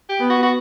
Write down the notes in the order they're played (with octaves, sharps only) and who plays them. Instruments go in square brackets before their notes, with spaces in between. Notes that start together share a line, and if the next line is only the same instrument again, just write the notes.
[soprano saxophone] G4
[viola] B3
[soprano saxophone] F#4
F#4